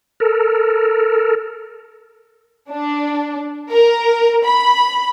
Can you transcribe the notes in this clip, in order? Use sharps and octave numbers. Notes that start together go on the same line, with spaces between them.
A4 A#4
D4
A#4
B5